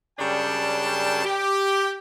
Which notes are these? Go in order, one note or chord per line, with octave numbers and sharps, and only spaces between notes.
F#2 C#3 G3 D4 G5 A5
G4